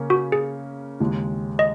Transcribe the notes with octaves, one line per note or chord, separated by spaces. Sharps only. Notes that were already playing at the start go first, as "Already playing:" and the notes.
Already playing: C#3 A#3 C#4
F#4
G#4
D#2 C#3 G#3
D#5